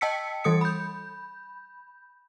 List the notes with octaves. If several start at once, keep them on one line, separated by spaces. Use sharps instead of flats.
D#5 G5 A5 E6 B6 C#7
E3 G3 A4 D#6 C#7
B5 G6